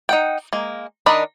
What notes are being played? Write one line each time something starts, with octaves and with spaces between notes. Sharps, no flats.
D#4 F#5 G5
G#3 A#3
D#3 D4 A#4 D#5 B5